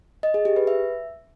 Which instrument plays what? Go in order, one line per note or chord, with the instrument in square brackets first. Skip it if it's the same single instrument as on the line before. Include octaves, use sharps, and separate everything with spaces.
[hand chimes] D#5
G#4
G4
B4
E5